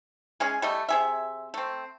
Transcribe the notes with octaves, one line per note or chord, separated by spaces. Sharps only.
G#3 C#4 G#4
G3 A3 D#5
C3 G#4 E5
A3 C4